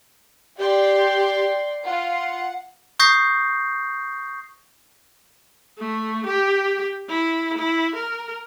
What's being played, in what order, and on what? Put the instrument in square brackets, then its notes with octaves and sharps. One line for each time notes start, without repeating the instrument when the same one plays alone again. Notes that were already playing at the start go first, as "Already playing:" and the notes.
[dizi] G4 [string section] D5 G5 C6
[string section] F4 [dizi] F#5
[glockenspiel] C#6 D#6 G6 A#6 C7
[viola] A3
G4
E4
E4
A#4